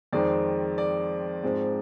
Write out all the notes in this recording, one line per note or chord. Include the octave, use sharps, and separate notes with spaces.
F2 D#3 G#3 C4 D5
D5
G#2 F3 G#3 C4